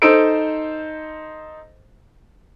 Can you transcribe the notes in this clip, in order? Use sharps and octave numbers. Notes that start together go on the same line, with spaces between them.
D#4 A4 C5 E6 D7